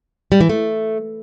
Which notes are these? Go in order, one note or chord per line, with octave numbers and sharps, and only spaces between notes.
G3
E3
A3